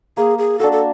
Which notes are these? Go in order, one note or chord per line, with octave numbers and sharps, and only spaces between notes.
A#3 G#4
G#4
D4 F#4 A4
A4